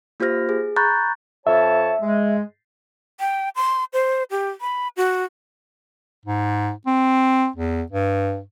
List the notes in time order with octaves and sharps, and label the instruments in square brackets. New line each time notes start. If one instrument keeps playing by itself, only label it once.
[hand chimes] A#3 F4 G4 C5 F6 A#6
G#4
A#5 B5 C#6 F#6 G6 A6
[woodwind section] F2 C#5 A5 [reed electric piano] E5
[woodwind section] G#3
[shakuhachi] G5
C6
C5
G4
B5
F#4
[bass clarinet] G#2
C4
E2
G2